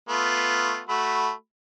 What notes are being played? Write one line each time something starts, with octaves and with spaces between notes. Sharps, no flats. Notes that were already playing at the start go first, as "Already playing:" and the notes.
A3 B3 F4
A3 F#4 B5